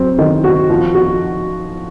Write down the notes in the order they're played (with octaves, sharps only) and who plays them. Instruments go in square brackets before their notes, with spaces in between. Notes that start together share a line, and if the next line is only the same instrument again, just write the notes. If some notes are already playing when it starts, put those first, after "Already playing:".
Already playing: [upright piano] F#3 C4
D#3
F#4
F3
F#4